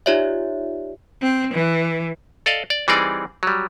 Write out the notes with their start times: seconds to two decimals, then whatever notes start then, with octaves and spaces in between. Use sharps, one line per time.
0.06 D#4 F4 G4 C#5 D5 E5
1.20 C4
1.53 E3
2.46 A4 D5 D#5 F5
2.70 D5
2.88 E3 G3 C4 D#4 G#4 D5
3.43 F#3 G3